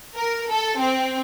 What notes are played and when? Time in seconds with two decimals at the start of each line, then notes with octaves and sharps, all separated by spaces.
0.15 A#4
0.49 A4
0.78 C4